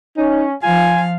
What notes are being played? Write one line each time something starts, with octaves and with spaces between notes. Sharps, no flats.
C#4 D#4
F3 F4 F5 G#5